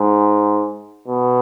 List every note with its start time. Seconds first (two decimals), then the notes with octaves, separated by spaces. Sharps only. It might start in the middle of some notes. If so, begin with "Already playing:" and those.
Already playing: G#2
1.08 B2